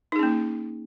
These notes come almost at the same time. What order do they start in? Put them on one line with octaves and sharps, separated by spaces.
D#4 G#4 C#4 A#3